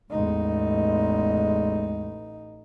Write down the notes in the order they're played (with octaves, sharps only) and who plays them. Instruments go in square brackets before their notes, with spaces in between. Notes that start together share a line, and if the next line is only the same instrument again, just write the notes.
[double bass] A1 D#4 [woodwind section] E2 G#3